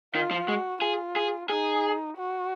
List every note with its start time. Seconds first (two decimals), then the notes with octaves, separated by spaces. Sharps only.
0.14 D#3 F4
0.31 F3
0.48 G#3 F#4
0.82 F4 G#4
1.16 G#4
1.49 D#4 G#4
2.17 F#4